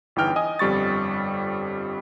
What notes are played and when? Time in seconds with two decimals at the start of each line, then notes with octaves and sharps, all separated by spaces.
0.16 G1 E2 E3 D#4 G5 F6
0.36 D#5 G#5 D#6
0.59 G1 F2 G3 C#6 A6